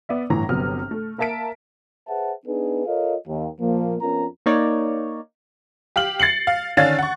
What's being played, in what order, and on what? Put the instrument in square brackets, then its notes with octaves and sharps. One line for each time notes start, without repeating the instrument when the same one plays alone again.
[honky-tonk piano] B3 D5 E5
G1 A2 E3 A#5 A#6
G1 C3 F#3 B3 F6
A3
A#3 A#4 E5 A5 B6 D7
[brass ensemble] G#4 B4 C5 E5 F#5 A5
B3 D4 D#4 G#4 B4
F4 A4 A#4 C#5 D#5 F5
D#2
A#2 F3 A#3
F2 B3 C#4 F4 A#4 A#5
[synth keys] A#3 D#4 C#5 D5
[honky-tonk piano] G4 F5 F6 F#7
A6 C7 C#7 F#7
F5
D3 D#3 C#4 D4 F5 A6
F#5 C#6